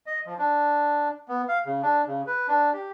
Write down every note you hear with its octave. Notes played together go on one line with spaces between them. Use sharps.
D#5
F3
D4
B3
F5
C#3
D4
C#3
B4
D4
G4